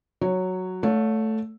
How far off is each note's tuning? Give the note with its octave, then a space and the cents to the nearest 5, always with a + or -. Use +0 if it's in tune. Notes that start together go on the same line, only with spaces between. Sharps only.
F#3 +0 C#5 +0
A3 +0 C#5 +30 F5 +45